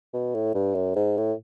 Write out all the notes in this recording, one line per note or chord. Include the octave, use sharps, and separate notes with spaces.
B2
A2
G2
F#2
G#2
A2